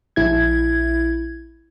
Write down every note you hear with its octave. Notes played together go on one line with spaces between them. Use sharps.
A#1 E4 G#6